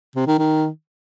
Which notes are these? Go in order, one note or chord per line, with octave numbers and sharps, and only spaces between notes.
C3
D#3
D#3